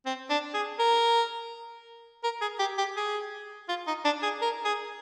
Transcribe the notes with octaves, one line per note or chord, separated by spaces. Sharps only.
C4
D4
G#4
A#4
A#4
G#4
G4
G4
G#4
F4
D#4
D4
G#4
A#4
G#4